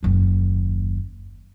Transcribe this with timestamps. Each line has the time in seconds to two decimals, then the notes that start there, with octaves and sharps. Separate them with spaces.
0.03 F#1 D#2